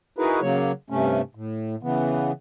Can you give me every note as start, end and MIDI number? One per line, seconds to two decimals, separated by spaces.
0.18 0.40 63
0.18 0.40 64
0.18 0.40 66
0.18 0.40 68
0.18 0.40 70
0.18 0.40 71
0.42 0.72 49
0.42 0.72 54
0.42 0.72 58
0.42 0.72 73
0.90 1.21 43
0.90 1.21 48
0.90 1.21 57
0.90 1.21 61
1.35 1.76 45
1.83 2.32 49
1.83 2.32 52
1.83 2.32 59